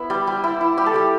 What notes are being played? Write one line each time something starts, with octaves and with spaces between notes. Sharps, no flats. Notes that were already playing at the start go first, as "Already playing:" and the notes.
Already playing: B3 E4
G3
G3
E4
E4
G3 G4
A4
G3 G4